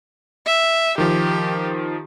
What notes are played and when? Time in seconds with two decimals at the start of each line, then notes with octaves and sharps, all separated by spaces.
0.46 E5
0.98 D#3 F3 G4